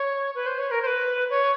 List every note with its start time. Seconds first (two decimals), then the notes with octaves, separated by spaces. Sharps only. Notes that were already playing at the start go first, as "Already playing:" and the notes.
Already playing: C#5
0.35 B4
0.47 C5
0.59 C#5
0.71 A#4
0.82 C5
0.87 B4
1.30 C#5